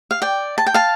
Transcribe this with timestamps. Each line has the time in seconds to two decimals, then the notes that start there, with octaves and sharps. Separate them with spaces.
0.11 F5
0.22 D5 G5
0.58 A5
0.66 G5
0.74 F5 A5